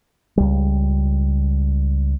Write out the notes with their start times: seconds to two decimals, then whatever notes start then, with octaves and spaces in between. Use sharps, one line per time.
0.37 C#2 G3